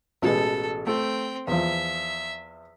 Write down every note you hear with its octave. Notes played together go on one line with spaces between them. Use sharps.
A1 B2 G#3 A4
A3 C4 G5
E2 F3 E5